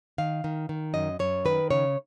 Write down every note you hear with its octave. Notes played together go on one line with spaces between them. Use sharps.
D#3 F5
D#3
D#3
F#2 D#5
F#2 C#5
D#3 B4
C#3 C#5